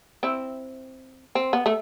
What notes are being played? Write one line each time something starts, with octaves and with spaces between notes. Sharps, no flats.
C4 E4
C4
B3
A3